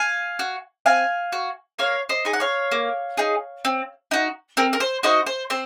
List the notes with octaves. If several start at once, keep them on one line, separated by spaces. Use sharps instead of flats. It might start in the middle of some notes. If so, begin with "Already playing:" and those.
Already playing: F5 G#5
F#4
C4 F5 G#5
F#4
A#3 C#5 F5
C5 D#5
D#4 G#4 G#5
F#5
C#5 F5
A#3
D#4 G#4
C4
D#4 F#4
C4 A#4
A#4
C5
D#4 F#4 C5 D#5
C5
C4 C5